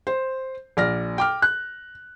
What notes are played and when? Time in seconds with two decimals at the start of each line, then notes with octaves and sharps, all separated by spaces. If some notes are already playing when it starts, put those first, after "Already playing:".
0.07 C5
0.77 A#1 D5 F6 A#6
1.18 G5 D6 F6
1.42 F#6